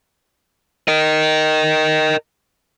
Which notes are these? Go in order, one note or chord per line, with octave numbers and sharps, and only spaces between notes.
A#4 D#5